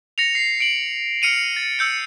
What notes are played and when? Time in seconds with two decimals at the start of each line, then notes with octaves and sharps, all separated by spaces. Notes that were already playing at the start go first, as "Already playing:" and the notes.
0.18 A#6 C#7 F7
0.35 C7
0.60 D7 F#7
1.22 F6 C#7 D#7 F7
1.56 A6
1.79 E6 G6 C#7